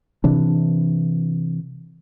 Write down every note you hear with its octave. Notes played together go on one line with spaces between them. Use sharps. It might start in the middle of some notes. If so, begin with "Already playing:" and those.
C3 E3 D4